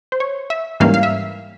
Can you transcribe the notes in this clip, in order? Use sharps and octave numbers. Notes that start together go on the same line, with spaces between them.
C5
C#5
E5
G#2 E3 G3 A#3 C#4 F5
F5
E5